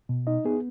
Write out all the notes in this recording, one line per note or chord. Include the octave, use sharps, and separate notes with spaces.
B2
D#4 D#5
B3 G#4